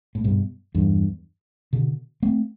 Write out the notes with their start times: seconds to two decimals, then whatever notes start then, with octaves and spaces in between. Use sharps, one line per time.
0.15 A2
0.24 G2 B2
0.75 E2 G2
1.73 B2 D3
2.23 A3 C4